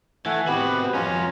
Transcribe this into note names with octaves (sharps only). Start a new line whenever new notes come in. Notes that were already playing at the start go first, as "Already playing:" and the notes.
E3 A3 F#5 G#5
B3 C4 F#4 G4 B4
F2 C#4 F4 G#5 A#5